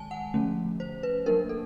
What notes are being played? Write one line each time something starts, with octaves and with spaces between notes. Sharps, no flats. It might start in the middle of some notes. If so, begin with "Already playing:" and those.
Already playing: D#3 G#3 G#5 A5
F#5
D3 F3 A3 C#4
C5
B4
F#3 A#3 D4 A#4
A4